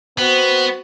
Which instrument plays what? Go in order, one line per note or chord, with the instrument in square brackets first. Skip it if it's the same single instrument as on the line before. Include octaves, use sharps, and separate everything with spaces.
[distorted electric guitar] B3 [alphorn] C4 [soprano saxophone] F#4